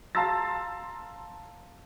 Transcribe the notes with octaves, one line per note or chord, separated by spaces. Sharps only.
F5 A5 A#5 C6 E6 A6